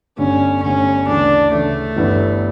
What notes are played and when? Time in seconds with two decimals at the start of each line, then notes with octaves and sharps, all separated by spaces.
0.17 G1 G2 D3 A3 C#4
0.63 G1 G2 D3 A3 C#4
1.07 D2 C#3 E3 D4
1.52 D2 C#3 E3 A3
1.96 G1 G2 E3 B3 E4